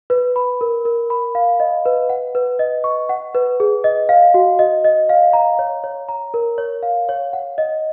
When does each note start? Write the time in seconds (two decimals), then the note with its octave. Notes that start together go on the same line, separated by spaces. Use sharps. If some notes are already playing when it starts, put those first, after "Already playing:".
0.10 B4
0.36 B5
0.61 A#4
0.85 A#4
1.10 B5
1.35 F5
1.60 D#5
1.86 B4
2.09 F#5
2.35 B4
2.59 D#5
2.84 C#6
3.09 F#5
3.35 B4
3.60 G#4
3.84 D#5
4.09 F5
4.34 F#4
4.59 D#5
4.84 D#5
5.09 F5
5.33 A#5
5.59 C#5
5.84 C#5
6.09 A#5
6.34 A#4
6.58 C#5
6.83 F5
7.09 C#5
7.33 F#5
7.58 D#5